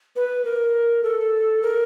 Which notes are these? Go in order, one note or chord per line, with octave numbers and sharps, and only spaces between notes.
B4
A#4
A4
A#4